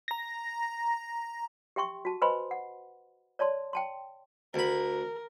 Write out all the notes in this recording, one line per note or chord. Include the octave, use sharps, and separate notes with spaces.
A#5 A#6
G4 E5 G5 C6 C#6
F#4 A5
B4 C5 D#5 G#5 B5 C6
F#5
C#5 D5 A5 C6
G5 A5 C6
D2 A#4 B5